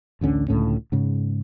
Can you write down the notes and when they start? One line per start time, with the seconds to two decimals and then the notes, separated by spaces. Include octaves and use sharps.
0.21 A1 D2 D3 C#4
0.48 C#2 A2 D3 C#4
0.92 G#2 C#3